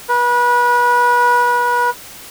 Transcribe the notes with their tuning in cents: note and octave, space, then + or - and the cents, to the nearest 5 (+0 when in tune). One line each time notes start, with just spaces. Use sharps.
B4 -30